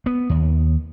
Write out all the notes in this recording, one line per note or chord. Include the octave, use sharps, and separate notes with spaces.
B3
D#2